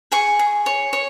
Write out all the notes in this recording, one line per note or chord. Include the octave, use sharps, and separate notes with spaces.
G#4 G#5 C#6
G#4
C#5
C#5